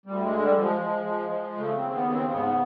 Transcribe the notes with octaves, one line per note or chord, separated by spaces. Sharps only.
D2 G3
G#3
D3
G3
F3
G#3
F3
F3
F3
C#3 A3
C4
D#2
B3
C#3
C4
G#2 B3